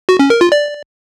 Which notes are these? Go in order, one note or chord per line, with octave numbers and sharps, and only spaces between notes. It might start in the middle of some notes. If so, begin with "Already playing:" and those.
F#4
C#4
A#4
F4
D5